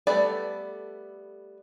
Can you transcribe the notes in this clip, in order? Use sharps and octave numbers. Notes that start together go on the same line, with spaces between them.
G3 A3 B3 A4 D5